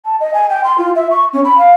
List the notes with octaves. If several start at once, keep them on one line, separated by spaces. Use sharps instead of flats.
A5
D#5
G#5
G5
C6
F4
E5
C#6
C#4
B5
F5